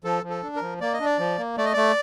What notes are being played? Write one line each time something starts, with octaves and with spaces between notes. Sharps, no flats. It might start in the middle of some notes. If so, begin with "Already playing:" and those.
F3 A4
F3
A4
D4
A#4
F3
A#3 D5
D#5
D4
D5
F3
A#3
A3 D5
D#5
A3 D5